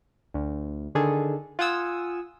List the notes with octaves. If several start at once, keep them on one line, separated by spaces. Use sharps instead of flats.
D2
D3 D#3 G#4 A4
F4 F#5 G#5 D#6 E6